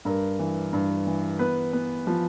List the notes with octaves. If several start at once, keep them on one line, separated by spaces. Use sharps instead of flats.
G2 A#4
E3
G2
E3
B3 B4
B3
F3